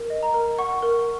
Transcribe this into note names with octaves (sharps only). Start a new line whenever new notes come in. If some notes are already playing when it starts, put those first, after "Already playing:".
Already playing: A#4
D#5
A#5
A#4
F#5 C#6
A#4